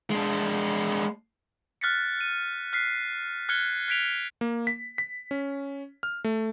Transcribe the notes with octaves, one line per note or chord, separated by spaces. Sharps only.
G#3 D4
F6 F#6 A6 B6 C#7
D#7
F6 F#6 B6 C7
F6 F#6 G#6 C#7 G7
F#6 G#6 B6 D7 F7
A#3
B6
B6
C#4
F6
A3